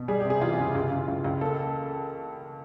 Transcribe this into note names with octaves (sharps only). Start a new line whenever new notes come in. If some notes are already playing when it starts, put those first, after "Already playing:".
Already playing: B2
G3 G#4
G4
C3
G#4
E3 F4
C#2
C#2
C#2
C#2
C#2
A#3 A4